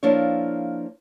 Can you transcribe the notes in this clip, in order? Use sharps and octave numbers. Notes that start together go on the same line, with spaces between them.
F3 A#3 D4 E4 C#5